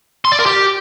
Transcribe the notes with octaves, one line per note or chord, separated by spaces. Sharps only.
C6
D5
A#4
G4